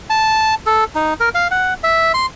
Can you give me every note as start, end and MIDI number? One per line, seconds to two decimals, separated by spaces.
0.10 0.55 81
0.66 0.84 69
0.95 1.14 63
1.20 1.29 70
1.35 1.48 77
1.51 1.74 78
1.84 2.12 76
2.14 2.26 84